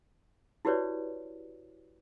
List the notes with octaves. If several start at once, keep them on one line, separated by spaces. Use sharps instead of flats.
E4 F#4 G4 B4 C#5 D5